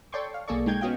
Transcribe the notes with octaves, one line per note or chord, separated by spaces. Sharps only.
A4 C#5 D5 G5 C6 C#6
F5
B1 A#3 G#4 A4 D5 C#6
G#3 D#4 G5 G6 G#6
B3 C#4 F#4 D#5 F5 G5